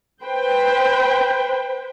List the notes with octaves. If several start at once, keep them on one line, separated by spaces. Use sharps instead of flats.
B4 C5 G5